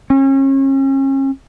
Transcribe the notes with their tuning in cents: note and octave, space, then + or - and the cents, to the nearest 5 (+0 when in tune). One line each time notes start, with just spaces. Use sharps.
C#4 -35